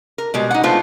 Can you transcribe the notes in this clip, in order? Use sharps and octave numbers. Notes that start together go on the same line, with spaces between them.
A#4
B2 G3 G#3
D#4 F#5
G#3 A3 B3 D4 F4 C5